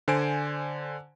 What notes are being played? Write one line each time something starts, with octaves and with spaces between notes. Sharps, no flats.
D3 C5 D5 G#5 D7